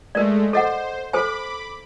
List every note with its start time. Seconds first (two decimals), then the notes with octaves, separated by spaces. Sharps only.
0.15 G#3 A3 A#4 D5
0.53 A4 C5 D#5 F#5
1.13 A4 C5 G#5 B5 D6